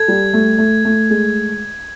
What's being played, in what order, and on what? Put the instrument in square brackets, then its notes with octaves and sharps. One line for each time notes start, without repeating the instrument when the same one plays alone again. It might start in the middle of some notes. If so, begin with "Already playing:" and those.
Already playing: [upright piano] A4 [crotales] G#6
[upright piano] G3
A3
A3
A3
G#3